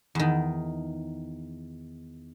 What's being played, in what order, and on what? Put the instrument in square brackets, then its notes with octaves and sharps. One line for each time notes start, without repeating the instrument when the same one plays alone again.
[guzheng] E2 D#3